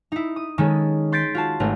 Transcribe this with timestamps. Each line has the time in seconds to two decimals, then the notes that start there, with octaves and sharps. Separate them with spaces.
0.12 D#4 E4
0.36 D#6
0.58 D#3 G#3 C#4 A4
1.12 C6 G6 A6 B6 C7 D7
1.35 F4 F#4 A5
1.60 G#1 A3 C4 A#4